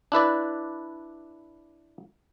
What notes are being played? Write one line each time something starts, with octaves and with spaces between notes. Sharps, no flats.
D4 E4 B4 D5